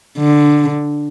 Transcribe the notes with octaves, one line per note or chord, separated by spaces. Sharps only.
D3